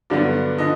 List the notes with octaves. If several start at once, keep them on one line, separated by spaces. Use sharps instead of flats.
G2 D3 F#3 B3 D4 D5
D3 F3 D#5